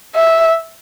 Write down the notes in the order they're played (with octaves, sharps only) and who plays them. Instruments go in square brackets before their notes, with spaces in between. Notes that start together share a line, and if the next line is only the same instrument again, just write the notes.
[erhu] E5